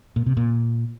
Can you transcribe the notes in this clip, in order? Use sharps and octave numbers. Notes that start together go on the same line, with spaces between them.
A#2
C3
A#2